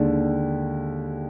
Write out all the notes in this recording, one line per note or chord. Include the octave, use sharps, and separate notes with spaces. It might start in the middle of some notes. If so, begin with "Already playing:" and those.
Already playing: D#2 D3 G#3